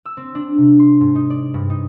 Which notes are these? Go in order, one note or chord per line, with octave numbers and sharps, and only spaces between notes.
E6
C4
D4
C3
C6
G#2
D#4
D5
G2
D#4